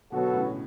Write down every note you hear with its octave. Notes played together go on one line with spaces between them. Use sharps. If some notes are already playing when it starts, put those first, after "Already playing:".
B2 D3 F#3 B3 F#4 A4
A2 C#3